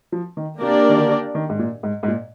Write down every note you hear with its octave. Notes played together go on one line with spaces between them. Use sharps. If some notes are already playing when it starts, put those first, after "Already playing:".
F3
D#3
C3 A#3 D4 G4 A#4 D5
D#3
D3
D#3
G#2
A#2
G#2
G#2
A#2